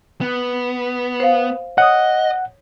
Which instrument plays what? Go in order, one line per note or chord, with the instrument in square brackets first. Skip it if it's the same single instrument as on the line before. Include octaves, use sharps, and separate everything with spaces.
[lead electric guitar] B3
[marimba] C5 F5
[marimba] C#5 D#6 [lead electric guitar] D#5 [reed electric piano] F#5